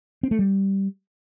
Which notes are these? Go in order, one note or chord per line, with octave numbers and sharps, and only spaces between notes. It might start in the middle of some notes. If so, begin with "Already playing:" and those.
C4
A3
G3